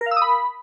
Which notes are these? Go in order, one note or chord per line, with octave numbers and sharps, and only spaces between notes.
A#4
F5
E6
D#6
B5